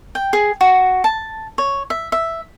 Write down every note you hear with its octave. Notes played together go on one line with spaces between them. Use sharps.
G5
G#4
F#4
A5
C#5
E5
E5